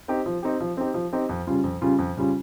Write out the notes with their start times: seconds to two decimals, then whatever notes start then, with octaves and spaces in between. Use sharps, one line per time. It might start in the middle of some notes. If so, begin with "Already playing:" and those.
0.08 C4 D#4 G4
0.26 F3
0.43 C4 D#4 G4
0.60 F3
0.77 C4 D#4 G4
0.94 F3
1.13 C4 D#4 G4
1.29 F2
1.47 C#3 G3 C#4 F4
1.64 F2
1.81 C#3 G3 C#4 F4
1.99 F2
2.17 C#3 G3 C#4 F4